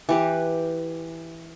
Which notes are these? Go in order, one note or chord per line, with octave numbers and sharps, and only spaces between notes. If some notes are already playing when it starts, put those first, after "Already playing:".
E3 G4 B4